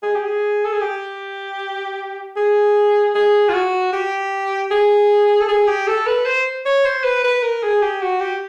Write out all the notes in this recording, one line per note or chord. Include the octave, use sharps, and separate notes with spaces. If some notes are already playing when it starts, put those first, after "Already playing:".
G#4
G4
G#4
A4
G#4
G4
G#4
G#4
F4
F#4
G4
G#4
A4
G#4
G4
A4
B4
C5
C#5
C5
B4
B4
A#4
G#4
G4
F#4
G4